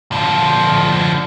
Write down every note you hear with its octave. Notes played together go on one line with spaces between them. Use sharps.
D3 F3